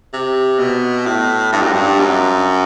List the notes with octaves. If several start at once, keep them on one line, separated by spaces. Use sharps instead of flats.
C3
B2
A2
G2
F#2
G2
F#2